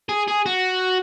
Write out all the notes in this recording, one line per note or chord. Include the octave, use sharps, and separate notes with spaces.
G#4
G#4
F#4